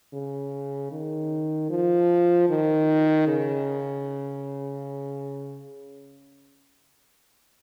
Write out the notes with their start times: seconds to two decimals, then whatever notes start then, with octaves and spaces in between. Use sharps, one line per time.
0.13 C#3
0.91 D#3
1.70 F3
2.49 D#3
3.27 C#3